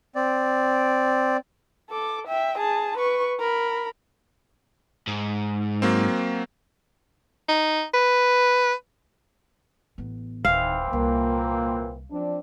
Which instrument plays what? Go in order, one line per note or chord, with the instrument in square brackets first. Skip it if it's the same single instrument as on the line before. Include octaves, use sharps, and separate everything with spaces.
[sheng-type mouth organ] C4 D5
[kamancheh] A4 D6
E5 G5
G#4 A5
B4 C#6
A#4 B5
[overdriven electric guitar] G#2
[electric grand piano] F#3 A#3 C4
[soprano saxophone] D#4
B4
[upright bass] A1 B3
[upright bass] D1 [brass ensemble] D#3 [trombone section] E3 C4 [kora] F5
[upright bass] C2 [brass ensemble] A#2 A#3
[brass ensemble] F3 C4 D4